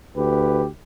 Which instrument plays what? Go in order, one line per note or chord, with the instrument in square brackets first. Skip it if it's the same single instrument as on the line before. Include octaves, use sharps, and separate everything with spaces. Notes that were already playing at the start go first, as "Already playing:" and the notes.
[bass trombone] D2 [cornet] G4 [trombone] B4